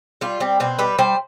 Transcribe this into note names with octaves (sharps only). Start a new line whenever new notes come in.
G3 F4
G3 C4
B2 C4
G3 B4
G3 C5